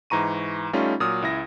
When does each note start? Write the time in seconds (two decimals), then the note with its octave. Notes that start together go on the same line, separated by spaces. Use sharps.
0.10 G#2 E3 A#5 C#6 D#7
0.73 G3 A3 C#4 D#4 F4
1.00 A#2 F#3 D#6 F6
1.22 C#2 E4 A#6